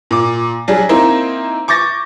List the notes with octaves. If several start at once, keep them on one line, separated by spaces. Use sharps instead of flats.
A#2 D6
F#3 G3 D4 G#4
A#3 C4 D#4 E4 A#4 C5
C#6 D6 G6 A6 A#6